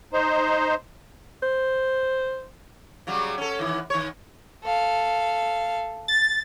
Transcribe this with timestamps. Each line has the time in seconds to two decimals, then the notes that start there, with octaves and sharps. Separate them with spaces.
0.13 D#4 C5
1.43 C5
3.07 C#3 F#3 G3
3.38 C#4 A4
3.59 D#3 E3
3.90 D#3 C#5
4.64 A4 F5
6.08 A6